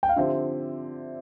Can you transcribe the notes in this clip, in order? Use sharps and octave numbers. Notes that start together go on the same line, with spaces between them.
G5
F5
D3 F3 C4 G4 E5